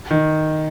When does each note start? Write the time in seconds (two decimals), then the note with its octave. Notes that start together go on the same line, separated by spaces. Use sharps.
0.11 D#3